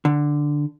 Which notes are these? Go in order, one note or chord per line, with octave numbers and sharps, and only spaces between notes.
D3